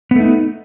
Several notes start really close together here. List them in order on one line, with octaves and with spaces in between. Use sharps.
B3 A3 D#4